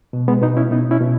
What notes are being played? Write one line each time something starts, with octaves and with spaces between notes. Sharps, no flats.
B2
G#3 B3
B2 B3 D#4
C#4 E4
B2 B3 D#4
C#4 E4
B2